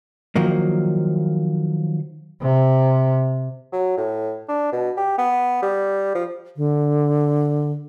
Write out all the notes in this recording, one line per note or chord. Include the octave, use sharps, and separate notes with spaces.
D#3 F3 F#3 A#3
C3
F#3
A2
D4
B2
G4
B3
G3
F3
D3